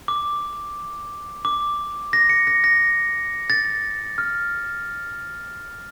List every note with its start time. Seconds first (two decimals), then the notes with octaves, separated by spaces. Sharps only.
0.08 D6
1.45 D6
2.13 A#6
2.29 C#7
2.47 A#6
2.64 A#6
3.50 A6
4.18 F6